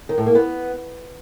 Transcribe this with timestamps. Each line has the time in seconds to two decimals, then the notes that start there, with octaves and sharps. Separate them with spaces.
0.09 D#3
0.18 A2
0.26 A#3
0.35 B3